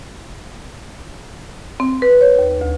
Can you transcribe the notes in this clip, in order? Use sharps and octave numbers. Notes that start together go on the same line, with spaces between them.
C4
B4
C#5
D#2
D2